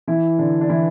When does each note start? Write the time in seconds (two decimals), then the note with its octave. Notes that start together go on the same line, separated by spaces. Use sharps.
0.07 E3 E4
0.39 D3 D4
0.61 D4
0.69 E3 E4